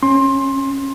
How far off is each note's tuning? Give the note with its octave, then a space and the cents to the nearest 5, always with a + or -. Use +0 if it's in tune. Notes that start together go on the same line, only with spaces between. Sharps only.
C#4 -20 C6 +20